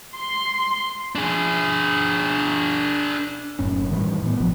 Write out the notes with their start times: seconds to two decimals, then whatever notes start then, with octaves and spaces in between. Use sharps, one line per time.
0.15 C6
1.15 D4 G#4
3.59 F#1 F#2 A2 C#4
3.90 A2 D#3 E3 G3
4.22 A2 B3
4.40 A1 B2 F3